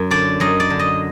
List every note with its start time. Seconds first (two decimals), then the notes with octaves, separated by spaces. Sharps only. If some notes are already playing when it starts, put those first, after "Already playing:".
Already playing: F#2
0.11 D3 D5
0.40 F#2 D#5
0.60 D5
0.70 D3
0.79 D#5